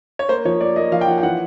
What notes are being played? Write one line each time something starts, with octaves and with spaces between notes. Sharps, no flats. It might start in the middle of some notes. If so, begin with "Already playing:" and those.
C#5
A#3 C5
F3 C#5
A#3 D5
A#3 D#5
F3 F5
G5
F3 F#5
G5
E3 F#5